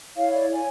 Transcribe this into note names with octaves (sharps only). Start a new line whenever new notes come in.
E4 A4 C#5 F5
D5
A4 C#5 G#5